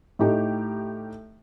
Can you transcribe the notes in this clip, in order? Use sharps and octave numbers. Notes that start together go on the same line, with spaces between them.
A2 A3 D#4 G4